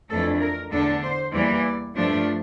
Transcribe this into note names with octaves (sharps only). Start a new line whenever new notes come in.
F2 E3 A3 D4 A4
A#4
E2 D3 A3 D4 A4
C5
E2 E3 G3 A#3 D5
G2 F3 A3 D4